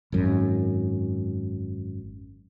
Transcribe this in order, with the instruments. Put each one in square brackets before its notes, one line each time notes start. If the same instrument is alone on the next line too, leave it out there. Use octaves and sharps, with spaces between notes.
[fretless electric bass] G#1 F#2